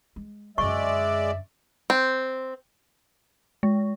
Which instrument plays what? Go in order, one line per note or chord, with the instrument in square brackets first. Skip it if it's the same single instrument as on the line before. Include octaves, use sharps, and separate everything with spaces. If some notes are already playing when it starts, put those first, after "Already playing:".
[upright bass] G#3
[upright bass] F#2 D3 [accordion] G#3 D5 [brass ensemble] E5 [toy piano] C#6
[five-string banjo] C4
[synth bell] G#3